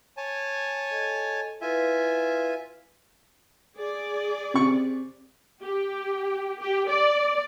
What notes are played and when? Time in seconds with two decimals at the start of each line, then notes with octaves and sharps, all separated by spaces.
0.17 C#5 G#5 A5
0.91 A4 D#5
1.61 E4 F4 B4 E5 G#5
3.77 G#4 D5
4.54 C3 C#6
5.62 G4
6.61 G4
6.90 D5